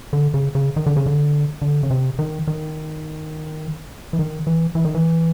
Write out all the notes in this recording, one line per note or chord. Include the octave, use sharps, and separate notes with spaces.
D3
C#3
C#3
D#3
D3
C#3
D3
D3
C#3
C3
D#3
D#3
E3
D#3
E3
E3
D#3
E3